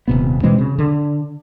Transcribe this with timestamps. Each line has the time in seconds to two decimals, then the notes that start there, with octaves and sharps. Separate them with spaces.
0.08 D#1 C3 B3
0.43 B2 E3 G#3 C4
0.59 C#3
0.79 D3